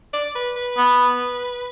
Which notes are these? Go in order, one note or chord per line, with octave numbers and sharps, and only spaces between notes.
D5
B4
B4
B3